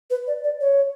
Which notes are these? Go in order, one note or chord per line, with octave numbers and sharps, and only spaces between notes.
B4
D5
D5
C#5